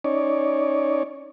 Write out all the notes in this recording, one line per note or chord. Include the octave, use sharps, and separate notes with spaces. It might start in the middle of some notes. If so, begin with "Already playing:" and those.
C#4 D#4 C#5 D5